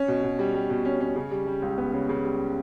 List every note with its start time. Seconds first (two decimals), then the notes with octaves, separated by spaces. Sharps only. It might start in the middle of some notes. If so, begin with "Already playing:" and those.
Already playing: C#4
0.08 B2
0.23 B2
0.39 G3
0.55 G3
0.70 B2
0.85 C#4
1.00 C#4
1.16 C#3
1.31 G3
1.47 G3
1.62 C#2
1.78 B3
1.94 C#3
2.09 C#3
2.25 G3